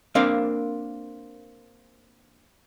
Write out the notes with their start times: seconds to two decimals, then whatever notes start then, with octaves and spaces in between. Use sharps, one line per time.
0.15 A#3 C4 D4 A#4 F5